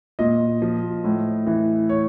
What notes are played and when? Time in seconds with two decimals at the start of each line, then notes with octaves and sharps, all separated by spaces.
0.19 A#2 D#5
0.62 F3
1.04 A2
1.47 E3
1.89 C#5